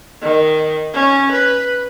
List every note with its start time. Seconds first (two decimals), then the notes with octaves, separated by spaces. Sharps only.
0.22 D#3
0.94 C#4
1.32 B4